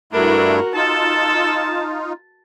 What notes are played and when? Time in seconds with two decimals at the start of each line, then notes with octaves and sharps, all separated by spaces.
0.13 G2 A3 D4 E4 F#4 A#4
0.75 D#4 F4 A4 A5